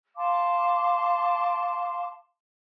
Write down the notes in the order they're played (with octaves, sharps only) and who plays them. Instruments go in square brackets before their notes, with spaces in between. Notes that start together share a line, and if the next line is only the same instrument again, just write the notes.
[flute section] F5 A5 C6 D6